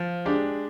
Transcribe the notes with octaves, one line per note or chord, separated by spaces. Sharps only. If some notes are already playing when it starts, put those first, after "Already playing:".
Already playing: F3
G#3 D4 G4